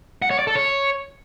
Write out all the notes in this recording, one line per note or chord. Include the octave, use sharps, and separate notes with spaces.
F#5
C#5
D5
A4
C#5